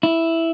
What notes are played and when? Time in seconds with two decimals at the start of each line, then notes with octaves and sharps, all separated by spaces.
0.03 E4